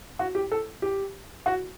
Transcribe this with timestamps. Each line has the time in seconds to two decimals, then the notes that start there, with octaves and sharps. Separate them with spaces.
0.19 F#4
0.35 G4
0.52 A4
0.82 G4
1.46 F#4